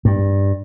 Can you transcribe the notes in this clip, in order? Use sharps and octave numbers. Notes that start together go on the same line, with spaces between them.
G2